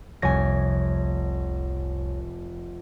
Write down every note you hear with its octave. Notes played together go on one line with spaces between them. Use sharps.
F1 C2 C#5 G#5 A#6